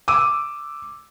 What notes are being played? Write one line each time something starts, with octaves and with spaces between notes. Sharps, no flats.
D6 E6 D#7